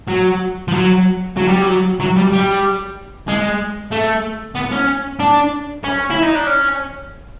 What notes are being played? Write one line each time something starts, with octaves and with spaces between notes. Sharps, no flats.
F#3
F3
F#3
F#3
G3
F#3
F#3
G3
G3
G#3
A3
B3
C#4
D4
C#4
E4
D#4
D4
C#4